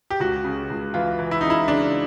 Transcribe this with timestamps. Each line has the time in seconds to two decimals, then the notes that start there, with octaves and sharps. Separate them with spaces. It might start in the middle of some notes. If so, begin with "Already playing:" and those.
0.10 G4
0.20 C#2 F#4
0.45 C#3
0.70 C#2
0.94 E3 F4
1.19 E3
1.31 E4
1.41 C#3 D#4
1.50 E4
1.68 C#3 D4